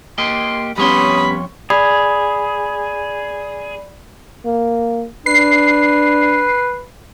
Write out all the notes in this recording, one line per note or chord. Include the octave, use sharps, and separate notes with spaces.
A#3 G4 D#5 C6
F2 G3 B3 C#4 C#5 B5 C6 D#6
G#4 D5 B5
A#3
D4 B4 C7